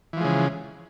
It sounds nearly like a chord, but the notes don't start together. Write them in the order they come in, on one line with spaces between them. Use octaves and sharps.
E3 F3 G#3 C#3